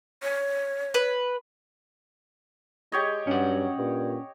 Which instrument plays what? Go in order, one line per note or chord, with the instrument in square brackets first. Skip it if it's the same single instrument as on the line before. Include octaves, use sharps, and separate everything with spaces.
[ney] C#5
[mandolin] B4
[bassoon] G#3 [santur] G4 C#5 D#5
[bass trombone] G2 [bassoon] F#3 [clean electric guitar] C#4 F#5
[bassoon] G2 [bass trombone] A#2